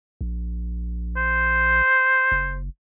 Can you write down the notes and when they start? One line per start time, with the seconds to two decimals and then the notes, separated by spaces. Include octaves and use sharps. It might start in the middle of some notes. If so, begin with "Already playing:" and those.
0.21 A#1
1.17 C5
2.32 F#1